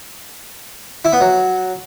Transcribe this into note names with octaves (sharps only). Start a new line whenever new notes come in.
E4
B3
F#3